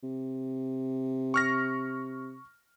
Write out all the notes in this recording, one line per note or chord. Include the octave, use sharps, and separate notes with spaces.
C3
C#6 F6 A#6